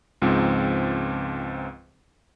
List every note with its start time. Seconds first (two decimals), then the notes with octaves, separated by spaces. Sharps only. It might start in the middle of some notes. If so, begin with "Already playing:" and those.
0.22 C#2 G#2 F3 C4